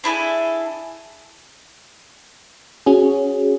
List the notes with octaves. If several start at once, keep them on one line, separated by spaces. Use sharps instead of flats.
D4 E4 G#4 A4
C#4 F#4 G#4